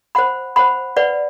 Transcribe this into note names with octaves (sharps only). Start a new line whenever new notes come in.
C5 F#5 B5
C5 F#5 B5
B4 D5 F#5